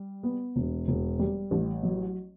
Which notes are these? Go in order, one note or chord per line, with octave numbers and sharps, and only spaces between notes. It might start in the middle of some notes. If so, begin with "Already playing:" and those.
Already playing: G3
B3
E1
E1
G3
A1
F#3